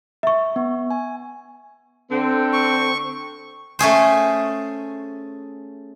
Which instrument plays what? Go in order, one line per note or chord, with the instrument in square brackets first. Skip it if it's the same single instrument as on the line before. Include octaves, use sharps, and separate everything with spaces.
[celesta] E5 C#6
[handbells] B3
G#5
[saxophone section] D3 C4
[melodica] C#6
[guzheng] A3 C#4 G#4 C5